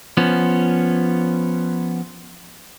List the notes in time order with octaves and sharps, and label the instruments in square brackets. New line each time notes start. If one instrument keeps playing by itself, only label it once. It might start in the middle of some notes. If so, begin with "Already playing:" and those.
[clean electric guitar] F3 B3 C#4